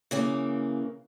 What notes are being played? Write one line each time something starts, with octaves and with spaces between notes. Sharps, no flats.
C#3 E3 A#3